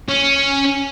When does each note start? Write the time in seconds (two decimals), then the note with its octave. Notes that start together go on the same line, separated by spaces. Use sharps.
0.08 C#4